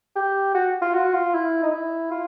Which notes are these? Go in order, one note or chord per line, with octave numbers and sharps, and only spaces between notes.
G4
F#4
F4
F#4
F4
E4
D#4
E4
F4